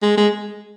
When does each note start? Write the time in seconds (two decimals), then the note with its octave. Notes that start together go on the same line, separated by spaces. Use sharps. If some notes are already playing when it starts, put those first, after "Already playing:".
0.02 G#3
0.17 G#3